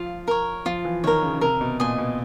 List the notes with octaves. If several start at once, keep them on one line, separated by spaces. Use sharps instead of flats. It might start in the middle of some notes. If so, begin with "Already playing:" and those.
Already playing: F3 F4
A#4 C#5
F3 F4
E3
D#3 A#4 C#5
C#3
C#3
C3 A#4
B2
A#2 D#5 G#5 C6
B2